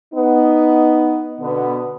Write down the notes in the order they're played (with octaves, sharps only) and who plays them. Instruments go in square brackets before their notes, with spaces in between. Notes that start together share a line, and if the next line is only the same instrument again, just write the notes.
[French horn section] B3 D#4
B2 D3 B3